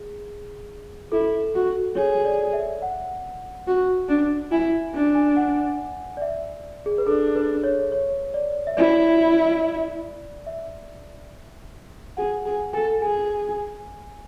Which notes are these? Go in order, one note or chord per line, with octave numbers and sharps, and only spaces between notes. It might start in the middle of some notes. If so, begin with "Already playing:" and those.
Already playing: G#4
E4 A4
F#4
G#4 C#5
D5
E5
F#5
F#4
D4
E4 G#5
D4
G#5
F#5
D5
E5
G#4
B4
D4 A4
B4
C#5
C#5
D5
E5
E4 D5
E5
G#4 F#5
G#4 G#5
A4 G#5
G#4 G#5